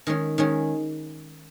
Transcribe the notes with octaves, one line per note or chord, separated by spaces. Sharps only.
D#3 G#3 C#4
D#3 G#3 C#4